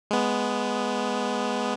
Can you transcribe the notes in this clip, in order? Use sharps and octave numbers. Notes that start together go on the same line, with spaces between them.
G#3 B3